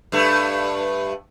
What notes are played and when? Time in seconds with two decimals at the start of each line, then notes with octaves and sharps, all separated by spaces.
0.12 G2 A3